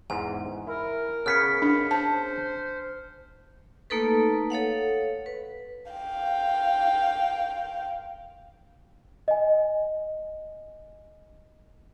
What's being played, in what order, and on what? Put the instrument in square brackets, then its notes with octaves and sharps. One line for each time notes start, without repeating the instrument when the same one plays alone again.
[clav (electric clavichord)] E2 G#2 [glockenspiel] G#5
[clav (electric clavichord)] E4 [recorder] A#4
[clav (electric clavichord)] C#3 B3 G#4 [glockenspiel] F6 B6 C#7
[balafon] D4
[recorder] C5 [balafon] A5
[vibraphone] A3 A#3 D#4 A4 B4
A4 C#5 F5 F#5
B4
[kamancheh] F5 G5
[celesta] D#5 G#5